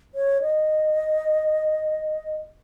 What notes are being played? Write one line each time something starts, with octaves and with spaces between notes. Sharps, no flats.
C#5
D#5